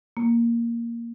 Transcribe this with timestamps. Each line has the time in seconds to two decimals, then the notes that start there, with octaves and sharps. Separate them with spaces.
0.17 A#3